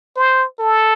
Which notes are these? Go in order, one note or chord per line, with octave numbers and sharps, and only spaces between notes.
C5
A4